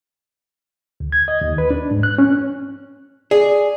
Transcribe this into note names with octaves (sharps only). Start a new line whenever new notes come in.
D2
G#6
D#5
D#2
B4
D4
G#2
F#6
C#4
G#4 D5